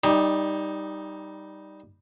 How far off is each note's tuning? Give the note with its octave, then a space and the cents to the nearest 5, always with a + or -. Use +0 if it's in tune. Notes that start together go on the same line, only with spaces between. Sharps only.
G3 +0 D#4 +0 G4 +30